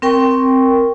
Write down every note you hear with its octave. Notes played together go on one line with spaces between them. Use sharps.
C4 A#4 G5 C#6